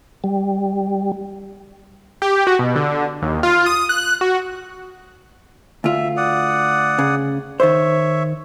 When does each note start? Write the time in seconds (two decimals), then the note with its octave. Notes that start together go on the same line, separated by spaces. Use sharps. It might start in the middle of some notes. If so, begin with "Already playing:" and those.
0.24 G3
2.22 G4
2.47 F#4
2.59 B2
2.76 D3
3.22 D#2
3.43 F4
3.66 D#6
3.89 F#6
4.21 F#4
5.84 D2 F4 E5
6.17 D5 F#5 D#6
6.99 C#3
7.60 D#3 C5 C#5 E5